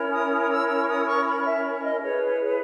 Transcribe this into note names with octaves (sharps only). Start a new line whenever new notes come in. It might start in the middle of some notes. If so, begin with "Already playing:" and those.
Already playing: C#4 E4 A#4 C#5
D#6
D#6
D#6
E6
E6
C#6
D#6
C#6
B5
E5
C#5
D#5
E4 G#4 B4 C#5
C#5
C#5